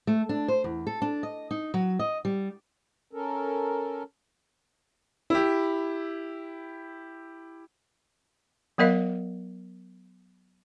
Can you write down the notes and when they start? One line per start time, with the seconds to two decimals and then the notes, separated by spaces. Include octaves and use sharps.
0.07 A3
0.29 D4
0.48 C5
0.64 E2
0.87 A4
1.02 D4
1.23 D#5
1.51 D#4
1.74 F#3
1.99 D#5
2.25 G3
3.13 C#4 A4 A#4
5.30 E4 G4
8.78 F#3 B3 A#4 D#5 F5